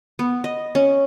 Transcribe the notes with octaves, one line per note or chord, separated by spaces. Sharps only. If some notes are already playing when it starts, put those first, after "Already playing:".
B3
D#5
C#4